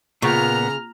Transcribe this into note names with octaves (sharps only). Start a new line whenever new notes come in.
A#2 C#3 A#3 B3 F4 A#5 C#6 F6